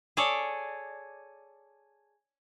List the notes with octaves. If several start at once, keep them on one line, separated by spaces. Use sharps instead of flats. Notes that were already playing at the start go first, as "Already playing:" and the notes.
G#4 A4 C#5 D5